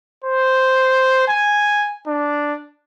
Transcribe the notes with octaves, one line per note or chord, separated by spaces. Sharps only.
C5
G#5
D4